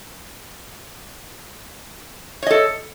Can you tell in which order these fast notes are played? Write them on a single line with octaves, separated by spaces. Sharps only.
C#5 D#5 A4